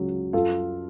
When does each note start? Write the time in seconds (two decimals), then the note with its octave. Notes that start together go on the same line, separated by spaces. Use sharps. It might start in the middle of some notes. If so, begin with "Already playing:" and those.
Already playing: C#2 C#3 F#3
0.33 F#2 F4 A4